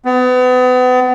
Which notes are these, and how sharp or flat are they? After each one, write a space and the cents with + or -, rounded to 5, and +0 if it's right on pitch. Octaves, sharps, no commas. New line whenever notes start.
B3 +35